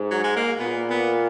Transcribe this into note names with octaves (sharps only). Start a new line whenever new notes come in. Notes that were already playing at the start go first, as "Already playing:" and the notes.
Already playing: G#2
F#3
G#3
A#3
A#2 B3
B3